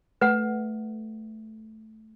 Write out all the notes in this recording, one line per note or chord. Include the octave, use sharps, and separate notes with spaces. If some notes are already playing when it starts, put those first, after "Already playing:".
A3 B4 F#5